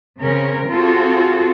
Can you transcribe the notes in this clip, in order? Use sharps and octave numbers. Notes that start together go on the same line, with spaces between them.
C#3 C4 C#4 A#4
C4 F4 F#4 G#4 A4